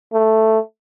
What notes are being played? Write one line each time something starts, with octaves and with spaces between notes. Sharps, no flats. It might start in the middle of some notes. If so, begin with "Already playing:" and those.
A3